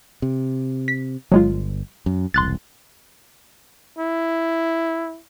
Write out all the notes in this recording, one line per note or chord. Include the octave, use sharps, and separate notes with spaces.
C3
B6
G1 F#3 G#3 F4
F#2
E1 C2 C6 F#6 A6
E4